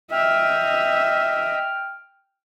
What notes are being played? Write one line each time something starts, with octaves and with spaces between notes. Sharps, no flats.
D#5 E5 G5 F6